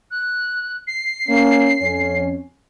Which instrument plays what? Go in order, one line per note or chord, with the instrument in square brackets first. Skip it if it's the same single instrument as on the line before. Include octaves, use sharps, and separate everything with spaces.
[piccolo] F#6
C7
[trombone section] A#3 C#4
F2 C#4